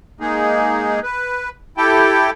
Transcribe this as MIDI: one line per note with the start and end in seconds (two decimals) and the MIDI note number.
0.20 1.00 56
0.20 1.00 58
0.20 1.00 63
0.20 1.00 68
1.03 1.49 71
1.77 2.30 64
1.77 2.30 67
1.77 2.30 69
1.77 2.30 79